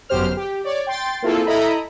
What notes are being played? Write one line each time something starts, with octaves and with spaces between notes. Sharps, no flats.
G1 F#2 B2 G4 C5 F6
G4
C#5 D5
G5 C6 A6
A#3 C4 E4 F4 G#4 A4
E4 A4 D#5 A#5 B5